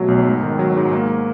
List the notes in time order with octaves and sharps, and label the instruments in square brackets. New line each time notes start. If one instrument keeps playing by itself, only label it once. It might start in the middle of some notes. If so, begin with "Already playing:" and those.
Already playing: [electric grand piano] B2 F#3 A3
B1
G#2
D#3
F#3
G#2
A#3